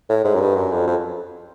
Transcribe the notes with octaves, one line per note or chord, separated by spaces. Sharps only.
A2
G#2
F#2
G2
F#2
F2
F2